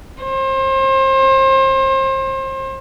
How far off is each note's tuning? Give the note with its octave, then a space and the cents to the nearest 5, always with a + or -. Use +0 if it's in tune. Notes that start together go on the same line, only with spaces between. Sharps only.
C5 +35